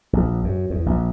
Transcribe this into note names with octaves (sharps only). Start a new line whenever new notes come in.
A#1
F#2
E2
A#1